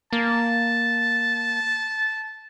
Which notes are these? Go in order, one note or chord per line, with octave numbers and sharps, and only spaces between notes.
A#3 A5